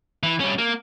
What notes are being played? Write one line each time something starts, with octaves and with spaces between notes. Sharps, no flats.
E3
G3 C#4
A#3